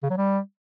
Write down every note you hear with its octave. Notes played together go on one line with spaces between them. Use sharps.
C#3
F#3
G3